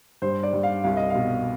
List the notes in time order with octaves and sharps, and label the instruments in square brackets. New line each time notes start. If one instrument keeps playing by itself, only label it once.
[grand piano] G2 C5
D5
G2
F5
C2 F5
D#5
F5
B2